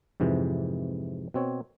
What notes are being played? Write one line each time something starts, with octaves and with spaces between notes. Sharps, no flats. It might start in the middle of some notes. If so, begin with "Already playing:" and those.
F2 G#2 C3 E3
B2 C4 C#5